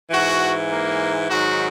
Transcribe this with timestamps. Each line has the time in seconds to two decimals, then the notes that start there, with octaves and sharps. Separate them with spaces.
0.11 G#2 E3 F#4
0.69 A#3
1.28 G#2 D#3 F#3 F#4